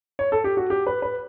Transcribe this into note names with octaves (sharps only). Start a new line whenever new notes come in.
C#5
A4
G4
F#4
G4
B4
B4